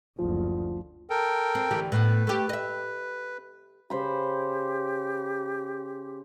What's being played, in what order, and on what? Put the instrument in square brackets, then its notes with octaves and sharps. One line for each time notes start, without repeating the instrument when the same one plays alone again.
[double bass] F#1 D2 [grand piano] F3
[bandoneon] A4 A#4 G5
[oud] C4
D2 E3 G4
[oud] A2 B3 [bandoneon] B4
[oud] A3 G4
D#5 E5
[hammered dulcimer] C#3 C5 B5 [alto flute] G4